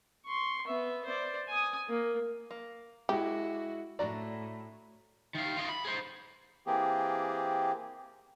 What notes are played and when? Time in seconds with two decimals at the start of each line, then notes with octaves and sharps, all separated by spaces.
0.26 C6 C#6
0.67 B3 E5
1.05 C5 D5
1.48 G#5 D#6
1.89 A#3
2.51 A#3
3.09 G#3 E4 F#4 G4
3.99 A2 D4 F#4 D5 A#5
5.35 D#3 F5
5.56 F4 D#5
5.69 B5
5.85 G#4 C5
6.67 E3 A#3 C4 G4 G#4